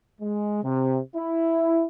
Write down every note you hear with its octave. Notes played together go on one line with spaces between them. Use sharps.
G#3
C3
E4